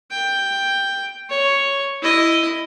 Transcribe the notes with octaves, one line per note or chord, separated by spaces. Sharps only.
G5
C#5
E4 D#5